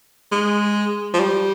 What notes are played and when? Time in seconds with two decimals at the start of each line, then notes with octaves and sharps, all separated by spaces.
0.32 G#3
1.14 F3
1.20 G3